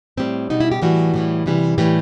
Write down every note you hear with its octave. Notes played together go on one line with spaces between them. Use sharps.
A2 G3 C4
B2 G3 D#4
E4
G4
A2 E3 G3 F#4
A2 E3 G3
C3 E3 G3
A2 E3 G3 G4